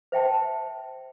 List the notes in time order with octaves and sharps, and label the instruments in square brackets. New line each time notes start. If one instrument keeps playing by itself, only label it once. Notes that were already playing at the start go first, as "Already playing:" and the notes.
[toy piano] C5 E5 G5 A5